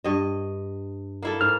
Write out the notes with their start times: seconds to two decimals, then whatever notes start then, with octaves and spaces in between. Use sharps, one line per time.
0.04 G2 D#5
1.23 A#3 E4 A4
1.41 G#2 F6